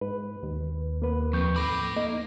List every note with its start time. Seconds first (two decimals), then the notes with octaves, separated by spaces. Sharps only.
0.01 G#2 B4
0.43 D#2
1.02 A#3 B4
1.33 F2 C#6 G6
1.56 A4 B5 D6
1.96 A#3 D#4